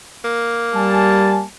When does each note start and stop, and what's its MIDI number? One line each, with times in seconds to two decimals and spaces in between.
0.25 1.47 58
0.75 1.44 55
0.75 1.44 80
0.75 1.44 81